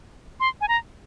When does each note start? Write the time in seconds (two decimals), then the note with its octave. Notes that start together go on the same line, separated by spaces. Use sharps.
0.40 C6
0.61 G#5
0.68 A#5